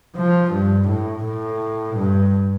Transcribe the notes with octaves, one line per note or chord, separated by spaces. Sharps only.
F3
G2
A2
A2
G2